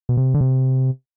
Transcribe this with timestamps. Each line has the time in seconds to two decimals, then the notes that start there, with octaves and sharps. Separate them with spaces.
0.09 B2
0.17 C3
0.34 D3
0.41 C3